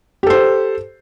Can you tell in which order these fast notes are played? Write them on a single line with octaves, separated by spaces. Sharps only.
G4 A4 C5